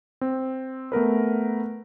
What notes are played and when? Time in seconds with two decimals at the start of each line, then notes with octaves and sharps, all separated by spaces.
0.21 C4
0.92 A3 B3 A#4 B4